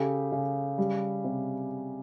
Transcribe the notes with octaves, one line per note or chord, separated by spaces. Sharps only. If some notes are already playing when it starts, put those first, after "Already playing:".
Already playing: C#3 G4 A4
C#3
G3
C3